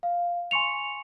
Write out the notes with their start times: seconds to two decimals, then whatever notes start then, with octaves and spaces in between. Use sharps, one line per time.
0.03 F5
0.51 G#5 C6 C#6 C#7 F7